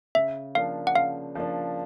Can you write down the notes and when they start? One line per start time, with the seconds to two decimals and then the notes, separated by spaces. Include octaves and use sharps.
0.15 C#3 E5
0.55 F3 A#3 D4 F5
0.87 F#5
0.95 C#3 F5
1.35 F3 A#3 D4